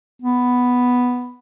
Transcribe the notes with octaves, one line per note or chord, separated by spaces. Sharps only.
B3